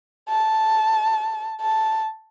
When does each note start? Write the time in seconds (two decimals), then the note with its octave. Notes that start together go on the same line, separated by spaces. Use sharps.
0.29 A5
1.62 A5